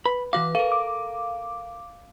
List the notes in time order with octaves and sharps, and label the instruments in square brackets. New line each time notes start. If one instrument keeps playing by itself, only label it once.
[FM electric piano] B4 [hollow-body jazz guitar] B5
[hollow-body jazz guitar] E3 F#4 F5 [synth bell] D6
[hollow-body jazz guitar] A4 A#4 [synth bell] F5
[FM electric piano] D6